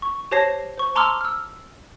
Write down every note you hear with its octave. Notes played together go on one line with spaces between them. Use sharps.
C#6
G4 C5 C#5 A5 A#6 C7
C5 C#6
A5 A#5 C6 D6 E6 F6
E6 F6